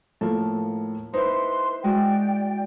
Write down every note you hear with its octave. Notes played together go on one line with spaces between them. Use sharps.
A2 F3 A#3 A4
D#4 E4 B4 C5 C6
G#3 F#4 D5 G5